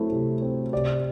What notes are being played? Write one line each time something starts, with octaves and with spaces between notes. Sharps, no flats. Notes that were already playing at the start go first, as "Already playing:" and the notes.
Already playing: F#3 A3 C4 E4
C3
C4
C3 D5